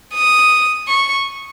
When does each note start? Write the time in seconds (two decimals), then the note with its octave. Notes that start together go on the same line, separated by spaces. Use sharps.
0.14 D#6
0.88 C#6